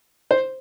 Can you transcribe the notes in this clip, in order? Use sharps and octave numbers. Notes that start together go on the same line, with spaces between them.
C5